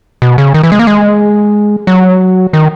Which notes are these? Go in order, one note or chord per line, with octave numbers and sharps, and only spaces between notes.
B2
C#3
D#3
E3
G#3
A#3
G#3
F#3
D#3